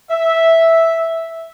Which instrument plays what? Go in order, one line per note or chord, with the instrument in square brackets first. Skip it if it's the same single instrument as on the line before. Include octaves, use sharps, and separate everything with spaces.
[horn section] E5